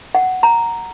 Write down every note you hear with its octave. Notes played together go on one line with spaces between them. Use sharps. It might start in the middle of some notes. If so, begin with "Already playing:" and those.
F#5
A#5